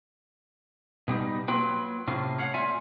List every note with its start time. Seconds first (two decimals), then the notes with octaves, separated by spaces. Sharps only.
1.08 B2 G3 D#4
1.48 F#3 A#3 F4 B4 G5
2.08 A2 C3 C#4 F4
2.38 C#5 F5 F#5
2.54 A3 F4 D5 E5 G#5